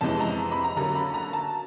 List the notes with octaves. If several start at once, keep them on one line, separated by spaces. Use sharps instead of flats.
F2 C3 E3 G#3 C#4 A5
A#5
B5
A#5
D3 F#3 A#3 C#4 A#5
B5
A#5
A5